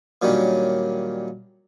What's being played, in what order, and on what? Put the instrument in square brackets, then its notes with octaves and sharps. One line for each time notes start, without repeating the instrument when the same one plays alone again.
[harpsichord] A#2 D#3 F#3 G3 C#4 D4